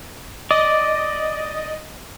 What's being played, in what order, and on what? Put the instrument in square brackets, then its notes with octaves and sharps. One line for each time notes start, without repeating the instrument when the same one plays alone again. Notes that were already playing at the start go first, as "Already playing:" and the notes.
[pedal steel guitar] D5 [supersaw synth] D#5